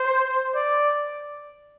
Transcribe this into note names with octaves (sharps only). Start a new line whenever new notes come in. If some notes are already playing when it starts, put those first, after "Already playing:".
Already playing: C5
D5